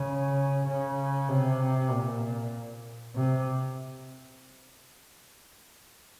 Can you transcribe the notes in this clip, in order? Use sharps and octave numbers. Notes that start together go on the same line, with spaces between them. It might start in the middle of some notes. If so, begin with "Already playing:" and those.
Already playing: C#3
C#3
C3
A#2
C3